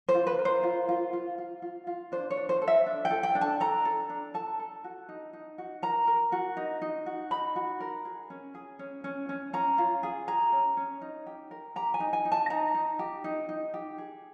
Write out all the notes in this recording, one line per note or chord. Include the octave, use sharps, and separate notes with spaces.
C5
F4
B4
A#4
C5
F4
F4
F4
F4
F4
F4
D4 C5
C#5
D4
C5
A4
E5
D4
G5
A4
G5
D4
A5
A4 A#5
A4
D4
A4 A5
A4
F#4
D#4
D#4
F#4
A#4 A#5
A#4
F#4
D#4
D#4
F#4
D#4 B5
F#4
A#4
G#4
C#4
G#4
C#4
C#4
C#4
C#4 A#5
F4
G#4
G#4 A#5
C#4
C#4
D#4
G4
A#4
G4 A#5
G#5
D#4
G#5
D#4
A5
D#4 A#5
D#4
G4
D#4
D#4
G4
G#4